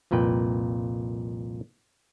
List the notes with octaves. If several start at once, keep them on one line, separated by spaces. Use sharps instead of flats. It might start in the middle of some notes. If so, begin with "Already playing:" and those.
C2 F2 A#2 B4 G5